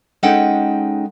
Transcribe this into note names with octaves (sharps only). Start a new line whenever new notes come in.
G#3 C#4 D#4 A4 F#5 G5